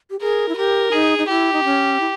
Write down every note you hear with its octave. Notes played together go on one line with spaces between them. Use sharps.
G4
G#4 A#4
E4
G4 A#4
D#4 G#4
D#4
E4 G4
D#4
C#4
E4